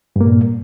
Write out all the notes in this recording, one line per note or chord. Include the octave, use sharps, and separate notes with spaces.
G2 A#2 A#3